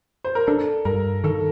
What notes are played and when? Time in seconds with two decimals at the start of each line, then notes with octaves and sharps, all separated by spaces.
0.24 C5
0.35 A#4
0.47 D4 A4
0.85 G2 A#4
1.24 D#3 A4